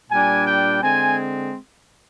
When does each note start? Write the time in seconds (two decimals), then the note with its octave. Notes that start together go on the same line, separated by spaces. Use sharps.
0.11 A#2 G3 D4 G#5
0.47 G5
0.82 D3 G#3 C4 G#5